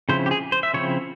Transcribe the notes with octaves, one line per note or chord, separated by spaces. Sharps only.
C#3 F3 C4 E4 C5
G4
G#4
C5
E5
C#3 F3 C4 E4 C#5